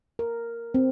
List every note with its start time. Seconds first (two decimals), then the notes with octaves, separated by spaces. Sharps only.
0.19 A#4
0.74 C4